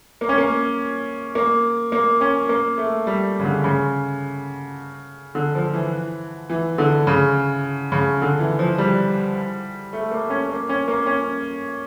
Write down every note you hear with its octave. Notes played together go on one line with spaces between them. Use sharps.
A#3
C#4
A#3
A#3
A#3
C#4
A#3
A3
G3
C#3
D3
C#3
D3
F3
E3
E3
D3
C#3
C#3
D3
E3
F3
G3
A3
A#3
C#4
A#3
C#4
A#3
C#4